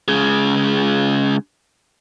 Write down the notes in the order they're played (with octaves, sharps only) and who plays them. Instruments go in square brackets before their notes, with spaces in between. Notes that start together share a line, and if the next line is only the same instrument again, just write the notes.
[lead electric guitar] C#3 G#3